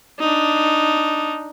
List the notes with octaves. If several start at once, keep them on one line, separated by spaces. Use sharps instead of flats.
D4 D#4